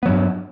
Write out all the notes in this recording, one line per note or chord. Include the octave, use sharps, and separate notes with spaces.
G2 F#3 B3